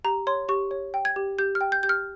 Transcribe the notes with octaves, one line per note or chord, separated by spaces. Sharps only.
G4 A#5
C#5 C6
G4 C#6
C#5
G5
G#6
G4
G4 G6
F6
G5
G6
G4 G6
F6